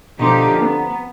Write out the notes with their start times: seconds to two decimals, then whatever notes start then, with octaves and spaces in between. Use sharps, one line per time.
0.19 B2 D3 F3 D#4 G4 A#5 C6
0.61 B3 C4 B4